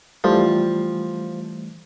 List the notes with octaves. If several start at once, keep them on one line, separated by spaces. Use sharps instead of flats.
E3 F3 G3 A3